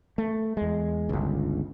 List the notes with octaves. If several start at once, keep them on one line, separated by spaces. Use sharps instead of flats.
A3
E2 G#3
G1 C#2